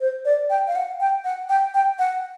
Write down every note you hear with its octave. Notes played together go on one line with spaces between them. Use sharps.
C5
D5
G5
F5
F#5
G5
F#5
G5
G5
F#5